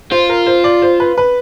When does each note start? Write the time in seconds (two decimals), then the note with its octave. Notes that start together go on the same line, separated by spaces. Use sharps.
0.11 F4 C5
0.29 A#4
0.46 C5
0.64 D5
0.82 C5
1.00 B4
1.18 B4